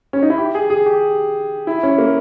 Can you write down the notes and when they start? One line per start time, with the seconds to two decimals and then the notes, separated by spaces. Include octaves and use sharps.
0.13 C#4
0.22 D#4
0.30 E4
0.38 G4
0.55 G#4
0.70 G#4
0.86 G4
1.67 E4
1.83 C#4
1.98 A#3